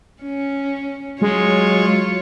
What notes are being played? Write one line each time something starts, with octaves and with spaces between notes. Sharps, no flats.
C#4
F#3 G#3 F4 C#5